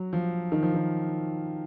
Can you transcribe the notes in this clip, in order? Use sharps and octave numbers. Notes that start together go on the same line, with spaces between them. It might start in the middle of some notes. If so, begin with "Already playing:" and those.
Already playing: F#3
F3
D#3
F3
D#3